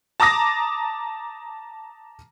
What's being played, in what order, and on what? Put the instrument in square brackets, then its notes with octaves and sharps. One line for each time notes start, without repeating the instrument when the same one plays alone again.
[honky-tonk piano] A5 A#5 D6 D#6 A#6